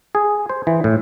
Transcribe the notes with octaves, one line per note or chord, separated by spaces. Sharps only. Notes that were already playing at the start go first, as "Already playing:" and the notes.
G#4
C5
E3
A2